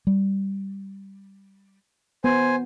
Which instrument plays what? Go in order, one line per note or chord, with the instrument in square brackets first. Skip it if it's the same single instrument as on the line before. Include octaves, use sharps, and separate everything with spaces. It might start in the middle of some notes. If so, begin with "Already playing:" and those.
[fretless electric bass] G3
[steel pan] B3 [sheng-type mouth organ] C5 G#5